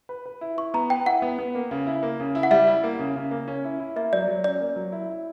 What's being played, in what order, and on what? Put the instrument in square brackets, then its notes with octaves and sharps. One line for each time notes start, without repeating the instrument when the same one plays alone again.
[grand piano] B4
B4
E4
[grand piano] E4 [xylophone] C#6
[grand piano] B3 [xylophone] A#5
[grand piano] B4 [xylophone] G5
[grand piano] E4 [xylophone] F#5
[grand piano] B3
B3
A#3
C#3
E4
A#3
C#3
E4
[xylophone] F#5
[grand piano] G3 [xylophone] E5
[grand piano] E4
A#3
C#3
C#3
A#3
C#4
E4
E4
[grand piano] A#3 [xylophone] E5
[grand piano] F#3 [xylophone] D5
[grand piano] F#3
[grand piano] C#4 [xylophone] D5
[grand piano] A#3
F#3
E4
E4